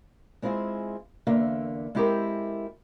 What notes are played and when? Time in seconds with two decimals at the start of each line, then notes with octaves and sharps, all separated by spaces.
0.42 G#3 C4 E4 F4 G#4
1.27 E2 D3 A#3 E5 F5
1.95 G#3 C4 E4 G4 A4 A#4